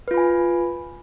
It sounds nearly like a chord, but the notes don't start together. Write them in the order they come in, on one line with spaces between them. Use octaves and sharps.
B4 F4 B5 G#5